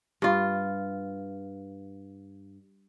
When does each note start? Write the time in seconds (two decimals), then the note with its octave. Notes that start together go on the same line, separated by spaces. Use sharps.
0.22 G2 F4